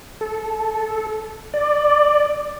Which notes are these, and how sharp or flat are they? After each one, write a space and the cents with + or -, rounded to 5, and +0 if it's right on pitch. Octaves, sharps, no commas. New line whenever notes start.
A4 -15
D5 +10